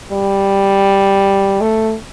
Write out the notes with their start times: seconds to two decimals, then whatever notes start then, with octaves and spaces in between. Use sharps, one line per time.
0.12 G3
1.61 A3